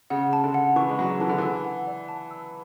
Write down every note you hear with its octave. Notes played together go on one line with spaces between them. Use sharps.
C#3 F#5
A5
D3
F#5
E3 C#6
G#3
F#3 F#5
E3 A5
D3
E3 E6
F#5
D5
A5
E6